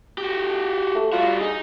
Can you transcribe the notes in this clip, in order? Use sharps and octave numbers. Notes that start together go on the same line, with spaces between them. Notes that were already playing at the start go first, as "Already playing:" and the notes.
F#4 G4
A3
G3 F4 F#4
D#4 G#4